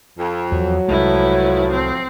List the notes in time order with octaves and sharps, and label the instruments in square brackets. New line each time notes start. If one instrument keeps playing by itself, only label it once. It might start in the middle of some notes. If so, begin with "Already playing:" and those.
[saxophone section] F2
[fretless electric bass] E2 F3 [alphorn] F#3
[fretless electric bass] C2 G#3 [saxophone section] A2 F3 [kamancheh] E4 B4
[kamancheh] C4